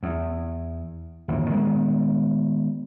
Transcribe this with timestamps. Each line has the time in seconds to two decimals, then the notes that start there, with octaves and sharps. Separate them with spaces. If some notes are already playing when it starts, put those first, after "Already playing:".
0.03 E2
1.28 G1 D#2 A2 E3
1.50 D#3 G#3 A#3 B3